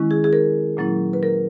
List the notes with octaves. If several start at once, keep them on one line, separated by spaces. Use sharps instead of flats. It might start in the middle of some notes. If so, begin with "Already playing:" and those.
Already playing: D#3 G#3 C#4 E4
G#4
G#4
A#4
A#2 F#3 A#3 C#4 E4
B4
A#4